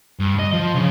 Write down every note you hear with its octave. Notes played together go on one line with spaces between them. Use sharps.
G2
D#5
F3
C#3